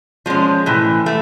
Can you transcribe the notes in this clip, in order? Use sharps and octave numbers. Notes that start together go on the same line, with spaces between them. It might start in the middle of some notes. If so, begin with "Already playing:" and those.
F3 G#3 C#4
A2 E3
A3